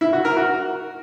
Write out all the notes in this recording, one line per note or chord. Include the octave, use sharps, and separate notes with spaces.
E4
F#4
A#4
F#4